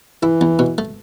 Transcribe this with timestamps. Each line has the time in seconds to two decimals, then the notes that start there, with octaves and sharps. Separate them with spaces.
0.22 E3 E4
0.41 E2
0.59 B2
0.78 A3